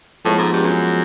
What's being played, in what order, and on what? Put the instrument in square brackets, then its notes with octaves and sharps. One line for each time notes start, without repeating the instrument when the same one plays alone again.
[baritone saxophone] A2 [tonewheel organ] F3 G#3 B3
[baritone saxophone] G#2
G2
F#2